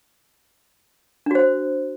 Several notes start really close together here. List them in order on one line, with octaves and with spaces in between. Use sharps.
D4 F#4 C5